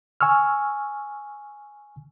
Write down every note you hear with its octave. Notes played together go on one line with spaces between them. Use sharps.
G#5 C#6 E6 F6